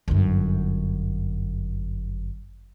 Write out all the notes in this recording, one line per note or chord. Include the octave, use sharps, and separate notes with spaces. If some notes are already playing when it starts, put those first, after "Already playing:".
G1 F#2